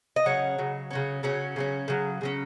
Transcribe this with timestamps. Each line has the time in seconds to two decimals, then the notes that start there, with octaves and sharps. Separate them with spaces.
0.16 D#5
0.26 C#3 F#3 C#4 C#5 F#5
0.58 C#3 F#3
0.91 C#3 F#3 C#4
1.23 C#3 F#3 C#4
1.56 C#3 F#3 C#4
1.88 C#3 F#3
2.21 C#3 F#3 C#4